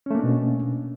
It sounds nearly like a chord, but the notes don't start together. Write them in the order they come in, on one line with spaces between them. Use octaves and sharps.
C#4 A3 A#3 D4 B2